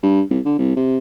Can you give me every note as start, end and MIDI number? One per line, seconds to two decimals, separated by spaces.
0.03 0.21 43
0.31 0.40 36
0.45 0.57 50
0.58 0.75 36
0.76 0.98 48